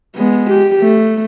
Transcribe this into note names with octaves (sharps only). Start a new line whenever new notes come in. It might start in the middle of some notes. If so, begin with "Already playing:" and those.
G#3 B3
G4
A3